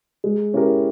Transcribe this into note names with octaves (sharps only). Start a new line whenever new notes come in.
G#3
C#4 E4 G4 A#4